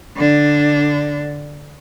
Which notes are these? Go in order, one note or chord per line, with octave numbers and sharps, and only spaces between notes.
D3 D4